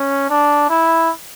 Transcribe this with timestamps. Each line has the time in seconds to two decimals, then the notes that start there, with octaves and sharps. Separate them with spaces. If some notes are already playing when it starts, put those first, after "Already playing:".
Already playing: C#4
0.30 D4
0.70 E4